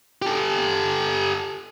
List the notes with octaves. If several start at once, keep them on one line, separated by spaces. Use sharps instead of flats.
G4 A4